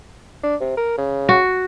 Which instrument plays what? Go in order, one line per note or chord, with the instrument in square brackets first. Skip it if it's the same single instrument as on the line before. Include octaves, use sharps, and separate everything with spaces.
[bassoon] D4
C3
A#4
C#3
[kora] F#4